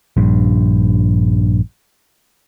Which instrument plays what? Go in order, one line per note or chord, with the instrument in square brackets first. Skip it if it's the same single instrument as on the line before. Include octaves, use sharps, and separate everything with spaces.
[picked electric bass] A#1 G2